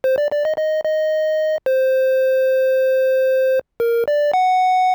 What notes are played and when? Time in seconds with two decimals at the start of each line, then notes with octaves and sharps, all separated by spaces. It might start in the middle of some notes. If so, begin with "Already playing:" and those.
0.04 C5
0.18 D5
0.32 D5
0.45 D#5
0.58 D#5
0.85 D#5
1.66 C5
3.80 A#4
4.08 D5
4.34 F#5